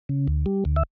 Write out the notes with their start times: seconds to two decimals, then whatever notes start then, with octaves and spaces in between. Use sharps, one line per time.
0.09 C#3
0.28 D2
0.46 G3
0.65 D2
0.76 E5